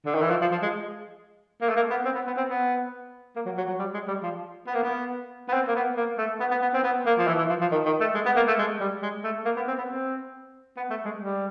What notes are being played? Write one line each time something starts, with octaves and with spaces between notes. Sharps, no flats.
D3
D#3
E3
F3
F3
F3
G#3
A#3
A3
A#3
B3
C4
B3
B3
C4
B3
A#3
F#3
F#3
F#3
G3
G#3
G3
F3
B3
A#3
B3
B3
C4
A#3
B3
A#3
A3
B3
B3
B3
C4
B3
A#3
F3
E3
E3
F3
F3
D#3
D#3
A3
G#3
B3
A#3
A3
G#3
G3
G#3
A3
A#3
B3
C4
B3
C4
B3
A3
G#3
G3